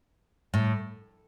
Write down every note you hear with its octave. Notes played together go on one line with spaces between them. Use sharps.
A2